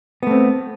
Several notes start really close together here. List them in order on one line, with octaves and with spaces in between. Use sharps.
B3 A3 C4